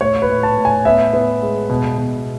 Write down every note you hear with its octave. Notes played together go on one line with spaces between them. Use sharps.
A2 C#5
B4
A2
A5
A2
G#5
B3 E5
B3
G#3
B2
B2